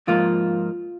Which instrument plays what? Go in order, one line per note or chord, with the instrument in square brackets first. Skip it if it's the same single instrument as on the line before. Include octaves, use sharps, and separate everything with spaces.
[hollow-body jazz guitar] G#2 F3 A#3 F4